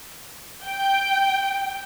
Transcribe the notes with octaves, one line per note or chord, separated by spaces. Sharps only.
G5